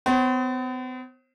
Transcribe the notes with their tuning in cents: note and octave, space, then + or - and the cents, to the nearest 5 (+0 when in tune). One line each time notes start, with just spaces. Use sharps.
B3 +45 C5 +35